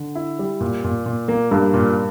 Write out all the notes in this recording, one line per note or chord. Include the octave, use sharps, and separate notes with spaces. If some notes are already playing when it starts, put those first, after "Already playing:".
Already playing: D3
E4
G3
A#2
A#2
A#2
A#3
G2 A#3
A#2